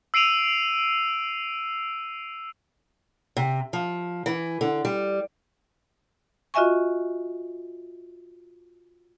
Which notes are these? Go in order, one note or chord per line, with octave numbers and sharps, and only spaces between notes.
E6 C7 D7 D#7 F7
C3
F3
E3
D3
G3
F4 F#4 D#5 E5 G#5 C#6